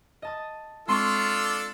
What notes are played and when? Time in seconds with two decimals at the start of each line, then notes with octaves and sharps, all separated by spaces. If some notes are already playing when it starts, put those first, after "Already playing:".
0.22 D#5 A5 D#6
0.88 G#3 C4 D4 F4 A4 C6 C#6 E6